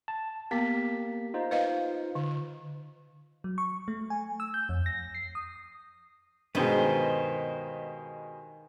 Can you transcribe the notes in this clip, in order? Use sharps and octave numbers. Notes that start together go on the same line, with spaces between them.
A5
A#3 B3 G4 B6
D#4 F4 C5
B4 D#5 F5
D3
F#3
C#6
A3
G#5
E6
G6
F2
A#6
C7
D#6
G2 B2 D#3 G#3 B4 C5